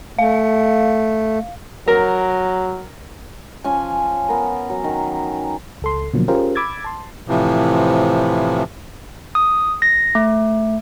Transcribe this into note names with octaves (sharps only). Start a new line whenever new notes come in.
A3 F5
F#3 A#4
F3 C#4 G#5
B3 A#4
F#3
D#3
C#2 A4 C6
B2 D3 F3 F#3 A#3
C#4 F4 G4 G#4 A#4 C5
B5 D6 E6 G#6 A6
A5 C6
A2 C3 E3 F3
D#6
A#6
A3